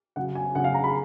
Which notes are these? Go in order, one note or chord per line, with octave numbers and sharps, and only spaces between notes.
C#3 F#3 F#5
G#5
C#3 F#3 F#5
F5
A#5
B5